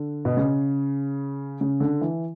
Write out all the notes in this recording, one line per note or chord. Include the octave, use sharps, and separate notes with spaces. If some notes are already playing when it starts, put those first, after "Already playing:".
Already playing: D3
B2
C#3
C#3
D3
E3